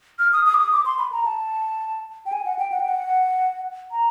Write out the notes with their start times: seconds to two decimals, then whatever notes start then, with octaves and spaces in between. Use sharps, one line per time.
0.19 F6
0.33 D#6
0.45 D#6
0.54 D6
0.59 D#6
0.72 D6
0.85 C6
0.99 B5
1.12 A#5
1.25 A5
2.26 G5
2.32 G#5
2.45 F#5
2.59 G5
2.72 F#5
2.80 G5
2.88 F#5
3.91 A#5